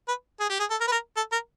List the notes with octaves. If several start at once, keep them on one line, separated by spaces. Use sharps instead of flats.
B4
G#4
G4
G#4
A4
A#4
B4
A#4
A4
A#4